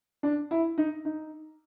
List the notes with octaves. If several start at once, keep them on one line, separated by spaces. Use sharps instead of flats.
D4
E4
D#4
D#4